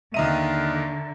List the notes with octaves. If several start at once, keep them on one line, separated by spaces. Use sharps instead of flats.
D#2 D3 D#5 E5 A#5 D#7